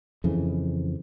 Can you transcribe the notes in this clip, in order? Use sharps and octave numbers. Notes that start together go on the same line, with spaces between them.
F2 C#3 E3